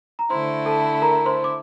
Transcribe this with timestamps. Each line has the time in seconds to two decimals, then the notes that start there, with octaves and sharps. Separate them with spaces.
0.19 A#5
0.30 D3 A3 E4 C5 C6
0.66 A4 A5
1.02 A#4 A#5
1.25 C5 C6
1.44 D6